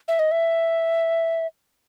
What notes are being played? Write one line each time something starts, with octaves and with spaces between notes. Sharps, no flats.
E5
D#5
E5